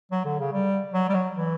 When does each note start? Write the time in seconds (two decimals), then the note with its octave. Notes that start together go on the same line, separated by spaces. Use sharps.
0.12 F#3
0.25 D3
0.39 C#3
0.53 G3
0.94 F#3
1.09 G3
1.14 F#3
1.34 E3